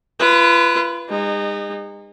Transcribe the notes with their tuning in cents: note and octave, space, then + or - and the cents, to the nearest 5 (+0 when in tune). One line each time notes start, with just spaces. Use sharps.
F4 -40 B4 +0
G#3 -45 D#4 -25